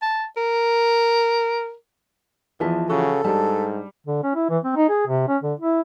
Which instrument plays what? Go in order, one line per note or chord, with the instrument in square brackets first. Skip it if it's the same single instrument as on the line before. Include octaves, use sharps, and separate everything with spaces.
[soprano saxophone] A5
A#4
[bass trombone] E2 [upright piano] E3 F3 [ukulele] D#5 E5 A5
[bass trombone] C#3 [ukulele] F#4 B4 F#5 [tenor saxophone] A4
[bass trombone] G#2 [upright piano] G3 [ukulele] D4 A5
[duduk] D3
C#4
E4
E3
C4
D#4
G#4
C3
C#4
D3
E4